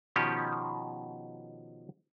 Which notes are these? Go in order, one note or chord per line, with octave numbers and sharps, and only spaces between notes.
B2 D#3 F3 C#4 G4